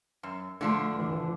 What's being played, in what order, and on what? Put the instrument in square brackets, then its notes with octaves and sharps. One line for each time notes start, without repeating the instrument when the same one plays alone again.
[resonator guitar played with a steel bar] F#2
[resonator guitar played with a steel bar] D3 F3 D4 [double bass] A3
[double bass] E3